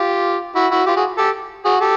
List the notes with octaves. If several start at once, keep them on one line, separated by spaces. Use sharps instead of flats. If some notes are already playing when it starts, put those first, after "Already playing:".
Already playing: F4 G4
E4 F#4
E4 F#4
F4 G4
F#4 G#4
G4 A4
F#4 G#4
G4 A4